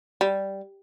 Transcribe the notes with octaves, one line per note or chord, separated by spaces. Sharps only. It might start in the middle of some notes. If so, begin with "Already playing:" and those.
G3